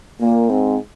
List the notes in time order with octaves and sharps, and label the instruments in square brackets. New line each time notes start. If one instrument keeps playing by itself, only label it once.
[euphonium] A#2 [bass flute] A#3
[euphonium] G#2 [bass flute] C4